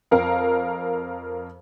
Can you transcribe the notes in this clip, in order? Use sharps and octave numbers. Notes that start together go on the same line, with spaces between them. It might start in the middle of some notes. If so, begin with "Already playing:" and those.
F2 A#4 F5